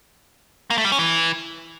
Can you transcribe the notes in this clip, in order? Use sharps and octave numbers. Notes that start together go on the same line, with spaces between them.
A#3
A3
G3
C#4
E3